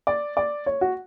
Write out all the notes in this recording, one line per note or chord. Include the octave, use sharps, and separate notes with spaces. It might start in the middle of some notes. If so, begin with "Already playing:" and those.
D5
D5
C#5
F#4